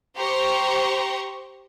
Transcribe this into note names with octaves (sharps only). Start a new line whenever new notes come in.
G4 C5 A#5 C6 C#6